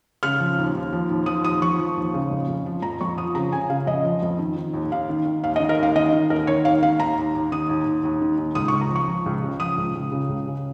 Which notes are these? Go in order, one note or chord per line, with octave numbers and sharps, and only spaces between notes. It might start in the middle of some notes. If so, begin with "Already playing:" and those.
C#3 F6
F3
D#2
D#2
F3
D#2
F3 D#6
D#2 D#6
F3 C#6
F3
D#2
C#3
F2
F2
F3
F2 A#5
F2 C#6
F3 D#6
C#3 A#5
C#3 G#5
C#3 F5
F2 D#5
F3
F2
D#3
D#3
D#2
D#2 F5
D#3
D#3
D#2 F5
D#5
D#3
A#4
D#2 F5
D#3 D#5
D#3
D#2 A#4
D#3 C#5
D#2 F5
D#3 F5
D#2 A#5
D#2
D#2
D#3 D#6
D#2
D#2
D#2
D#3
D#2
C#2 D#6
C#6
C#2
A#5
F3
C#6
F3
C#2
C#3
F3 D#6
C#2
C#2
C#3
C#2
C#3